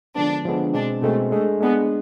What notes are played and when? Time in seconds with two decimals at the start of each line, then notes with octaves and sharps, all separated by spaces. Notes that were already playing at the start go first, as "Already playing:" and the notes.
0.16 D3 F3 G#3 B3 D4
0.45 D3 F3 G#3 B3
0.73 B2 G#3 C4 D4
1.02 B2 G#3 A3 C4
1.32 G#3 A3 D4 G#4
1.60 G#3 B3 D4 G#4